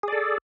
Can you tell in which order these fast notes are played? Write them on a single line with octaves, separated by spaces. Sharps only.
G#4 D5 A4